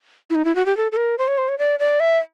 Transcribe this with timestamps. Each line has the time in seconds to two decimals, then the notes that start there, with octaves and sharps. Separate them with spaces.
0.30 E4
0.35 D#4
0.45 E4
0.56 F#4
0.66 G4
0.77 A4
0.92 A4
0.97 A#4
1.18 C5
1.28 C#5
1.38 C5
1.49 C#5
1.58 D5
1.79 D5
2.00 E5